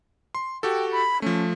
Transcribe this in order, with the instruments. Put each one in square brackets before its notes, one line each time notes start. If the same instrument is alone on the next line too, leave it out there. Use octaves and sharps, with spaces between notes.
[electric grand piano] C6
[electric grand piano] F#4 G4 A4 [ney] G5
[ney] B5
[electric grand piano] F3 A3 [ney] C#4